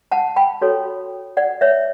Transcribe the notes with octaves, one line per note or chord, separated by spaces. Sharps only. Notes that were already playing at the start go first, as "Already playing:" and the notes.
F#5 A5
G5 B5
F#4 A4 C#5
D5 F#5
C#5 E5